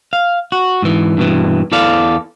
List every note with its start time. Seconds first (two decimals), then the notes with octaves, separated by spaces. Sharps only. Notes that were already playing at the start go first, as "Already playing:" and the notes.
0.13 F5
0.52 F#4
0.82 G#2 E3
1.17 G2 B2 E3
1.72 E2 E3 A4 D5 F5